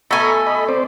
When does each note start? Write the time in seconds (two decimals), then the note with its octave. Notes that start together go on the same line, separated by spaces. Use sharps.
0.11 B2 A3 A4 G#5 A#5 B5 C#6
0.46 D#5 B5
0.68 C4 C5 D5